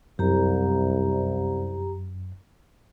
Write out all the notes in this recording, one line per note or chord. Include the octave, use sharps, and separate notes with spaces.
C2 F#2 G4 A#5